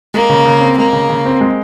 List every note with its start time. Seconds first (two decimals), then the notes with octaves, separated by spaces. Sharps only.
0.14 G#3 A#3
0.30 C#3
0.45 C#3
0.61 C4
0.77 G#3 A#3
0.93 C#3
1.10 C#3
1.26 C4
1.41 G#3